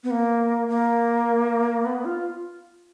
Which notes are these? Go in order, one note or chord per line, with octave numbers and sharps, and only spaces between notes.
B3
A#3
A#3
B3
F4